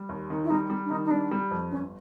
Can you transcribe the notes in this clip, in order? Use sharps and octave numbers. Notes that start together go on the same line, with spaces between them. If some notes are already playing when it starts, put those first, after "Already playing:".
Already playing: G3
D#2
D#3
E4
G3 D#4
G3
D4
D#3 D#4
D#4
G3 D4
G3
F2
G1 C#4